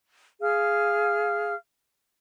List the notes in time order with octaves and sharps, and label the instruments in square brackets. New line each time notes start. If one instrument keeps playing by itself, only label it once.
[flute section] G#4 F5 F6